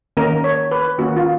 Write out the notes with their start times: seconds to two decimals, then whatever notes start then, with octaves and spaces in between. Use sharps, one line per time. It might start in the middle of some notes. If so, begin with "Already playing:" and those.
0.17 D#3 A#3 C#4 A#4
0.44 C#5
0.71 B4
0.98 D#3 A#3 C#4 F#4
1.17 F4